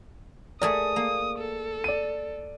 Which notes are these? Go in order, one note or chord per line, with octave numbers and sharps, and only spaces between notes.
A3 G#4 A#4 D5 D#6
A#3
A4
D5 D#7